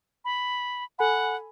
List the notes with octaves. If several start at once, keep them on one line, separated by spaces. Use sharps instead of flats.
B5
A4 F#5 G#5 B5